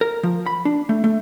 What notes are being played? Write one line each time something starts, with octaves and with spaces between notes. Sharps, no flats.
A#4
F3
B5
D4
A3
A3